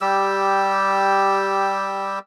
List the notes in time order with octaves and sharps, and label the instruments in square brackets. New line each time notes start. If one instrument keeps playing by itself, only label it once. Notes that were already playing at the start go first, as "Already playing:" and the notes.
[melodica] G3 G4 E6